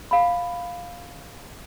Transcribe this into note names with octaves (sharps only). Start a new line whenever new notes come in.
F5 B5